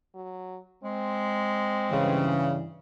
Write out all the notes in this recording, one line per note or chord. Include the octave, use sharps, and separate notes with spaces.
F#3
G#3 C4
G2 C#3 E3